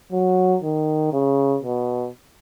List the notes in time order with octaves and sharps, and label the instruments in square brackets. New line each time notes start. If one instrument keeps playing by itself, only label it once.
[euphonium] F#3
D#3
C#3
B2